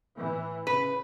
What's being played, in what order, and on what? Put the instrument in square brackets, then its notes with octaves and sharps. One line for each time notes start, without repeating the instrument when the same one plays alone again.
[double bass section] A2 E3
[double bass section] C#3 [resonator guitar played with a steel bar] B4